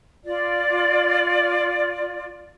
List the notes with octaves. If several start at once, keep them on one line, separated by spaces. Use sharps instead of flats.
F4 D5